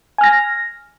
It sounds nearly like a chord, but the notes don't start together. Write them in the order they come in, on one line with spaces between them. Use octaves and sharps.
G#5 F6 A#6